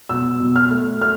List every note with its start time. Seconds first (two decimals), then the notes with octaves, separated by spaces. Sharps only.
0.09 B2 E6
0.40 B2
0.56 F6
0.71 A3
1.01 A3 F6